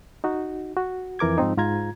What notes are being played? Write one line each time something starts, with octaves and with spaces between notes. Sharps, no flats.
D#4 F#4
F#4
F2 E3 A#4 D6 G#6
G#2 F3 C4 D#4
G#2 F4 A#5 G#6